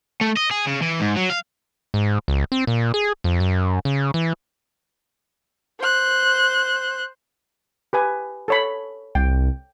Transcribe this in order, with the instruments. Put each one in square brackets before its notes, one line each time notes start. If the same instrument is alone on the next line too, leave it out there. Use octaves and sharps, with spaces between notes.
[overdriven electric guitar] A3
D#5
G#4
C#3
E3
G#2
F#3
F5
[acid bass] G#2
C#2
C4
A#2
G#4
F2
F#2
C#3
E3
[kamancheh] C5 F#6
[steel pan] G4 B4 G#5
A4 C#5 B5
[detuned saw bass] C2 [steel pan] G5